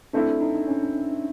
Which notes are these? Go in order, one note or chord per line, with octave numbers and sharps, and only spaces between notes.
A3 C4 D4 E4
D#4
C#4